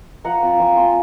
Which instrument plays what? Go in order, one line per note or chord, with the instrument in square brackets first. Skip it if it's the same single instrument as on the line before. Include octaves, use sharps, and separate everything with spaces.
[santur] F3 F#5 A#5
C4 F4
F3 G#5 C6
C4 F4 G#5 C6